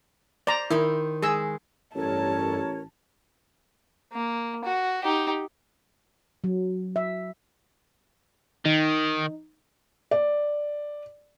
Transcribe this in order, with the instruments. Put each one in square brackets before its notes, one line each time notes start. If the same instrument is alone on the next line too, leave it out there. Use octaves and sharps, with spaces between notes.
[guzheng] C5 [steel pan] D5 A#5
[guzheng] D#3 D#4 C6 [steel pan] E4
[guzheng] G#3 [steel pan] G#4 E6
[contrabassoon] A1 [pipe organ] G2 G3 A4 [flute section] A#4 C#5 [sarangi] A5
[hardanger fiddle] A#3
F#4
D#4 G4
[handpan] F#3
E5
[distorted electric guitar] D#3 [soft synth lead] D#4
[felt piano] D5